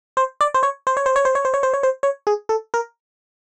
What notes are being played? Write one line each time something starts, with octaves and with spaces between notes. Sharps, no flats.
C5
D5
C5
C#5
C5
C#5
C5
C#5
C5
C#5
C5
C#5
C5
C#5
C5
C#5
G#4
A4
A#4